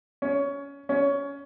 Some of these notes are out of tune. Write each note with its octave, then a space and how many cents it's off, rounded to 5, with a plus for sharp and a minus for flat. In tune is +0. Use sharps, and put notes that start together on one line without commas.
C#4 +20
C#4 +20